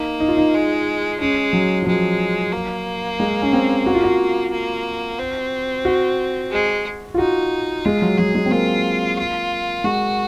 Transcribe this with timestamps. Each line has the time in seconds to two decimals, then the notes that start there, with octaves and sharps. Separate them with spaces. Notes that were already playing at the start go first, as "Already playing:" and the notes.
Already playing: A#3 D#4
0.20 D#4
0.28 F4
0.37 D#4
0.54 G#3
1.20 G#3 C#4
1.53 F#3
1.82 F3
1.87 F#3 G#3
2.53 A#3
3.20 G#3
3.42 C#4
3.53 C4
3.86 F#4
3.95 F4
4.03 F#4
4.52 A#3
5.18 C4
5.85 F#4
6.51 G#3
7.14 F4
7.18 D#4 F#4
7.85 G#3 F4
8.02 F#3
8.18 F#3 G#4
8.35 G#3
8.46 C4
8.51 A#3 F4
9.18 F4
9.84 G#3 F#4